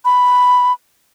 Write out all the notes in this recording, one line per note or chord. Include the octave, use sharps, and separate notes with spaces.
B5